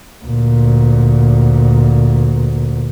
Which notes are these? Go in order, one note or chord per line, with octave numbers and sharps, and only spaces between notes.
D2 A#2